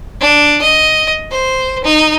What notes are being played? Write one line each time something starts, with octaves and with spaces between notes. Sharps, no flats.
D4
D#5
C5
D#4